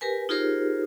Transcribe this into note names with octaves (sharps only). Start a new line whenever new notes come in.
G4 A#4 B4 G#5
D#4 F4 G4 G#4 A#4 C5